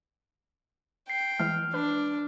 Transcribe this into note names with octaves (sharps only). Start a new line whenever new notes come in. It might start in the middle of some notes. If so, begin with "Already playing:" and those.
G5 C7
E3 G#3 F6
D4 B4